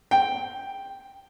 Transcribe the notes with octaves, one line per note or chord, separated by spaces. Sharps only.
G5